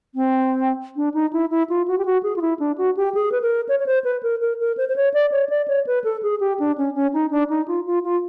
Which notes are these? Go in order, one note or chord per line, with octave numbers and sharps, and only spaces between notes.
C4
D4
D#4
E4
E4
F4
F#4
G4
F#4
G#4
F4
E4
D4
F#4
G4
G#4
B4
A#4
C#5
C#5
C5
B4
A#4
A#4
A#4
C5
C5
C#5
D5
C#5
D5
C#5
B4
A4
G#4
G4
D4
C#4
C#4
D#4
D4
D#4
F4
F4
F4